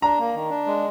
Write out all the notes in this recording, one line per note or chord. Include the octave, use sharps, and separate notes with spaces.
D4 A#5
A#3
D#3
D4
G#3